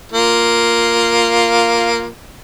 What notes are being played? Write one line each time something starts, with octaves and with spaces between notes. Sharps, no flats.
A#3 F4